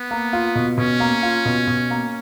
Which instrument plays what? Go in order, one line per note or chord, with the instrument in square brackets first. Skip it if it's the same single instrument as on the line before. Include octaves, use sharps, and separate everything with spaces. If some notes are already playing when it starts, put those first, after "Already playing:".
Already playing: [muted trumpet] B3
[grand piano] A#3
F4
B2
[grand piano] B2 [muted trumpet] C#4
[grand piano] A#3
F4
B2
B2
A#3